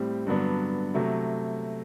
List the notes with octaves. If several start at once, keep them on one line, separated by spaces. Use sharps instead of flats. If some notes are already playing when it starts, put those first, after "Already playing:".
Already playing: A2 G3 C4 G4
G2 D3 F#3 B3 D4
C3 F#3 A3